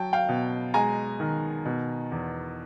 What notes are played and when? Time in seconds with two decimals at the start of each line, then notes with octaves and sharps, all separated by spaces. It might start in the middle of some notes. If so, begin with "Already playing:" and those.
Already playing: F#3 G5 A5
0.13 F5 G5
0.29 B2
0.74 G#3 G#5 A#5
1.20 D#3
1.65 B2
2.12 E2